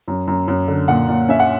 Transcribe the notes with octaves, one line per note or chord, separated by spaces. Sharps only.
F#2
F#2
F#2
D3
A#2 F#5
A#2
C#4 E5
F#5